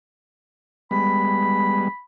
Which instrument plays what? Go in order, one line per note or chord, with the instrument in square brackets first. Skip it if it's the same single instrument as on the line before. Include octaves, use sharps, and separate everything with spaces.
[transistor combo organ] G3 G#3 B3 [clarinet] B5